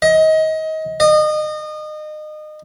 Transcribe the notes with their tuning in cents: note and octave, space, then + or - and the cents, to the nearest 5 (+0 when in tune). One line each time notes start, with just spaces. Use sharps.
D#5 +25
D#5 -30